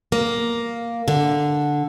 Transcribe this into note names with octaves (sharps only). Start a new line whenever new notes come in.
A#3
D3